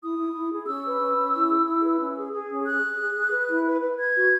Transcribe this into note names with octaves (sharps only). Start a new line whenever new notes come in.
E4 D#6
E4
E4
G#4
C#4 E6
B4
C#4
C#4
E4
G#4
E4
B4
C#4
G#4
G#4
C#4
G#4 F#6
G#4
G#4
G#4
B4
E4
B4
B4
B4 G#6
F#4